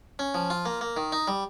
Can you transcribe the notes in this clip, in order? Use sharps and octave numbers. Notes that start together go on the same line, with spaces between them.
C#4
F3
F4
A#3
A#3
D#3
D#4
G3